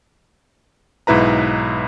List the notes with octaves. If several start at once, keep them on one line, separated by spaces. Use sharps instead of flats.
B1 G#2 E4 B4 A#5